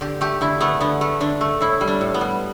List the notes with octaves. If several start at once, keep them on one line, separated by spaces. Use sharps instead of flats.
D3 G4
A3 G4
D3 E4
A3 B3
D3 B3
A3
D3 D4
A3
A2 E4
G3
D4
A2
B3
G3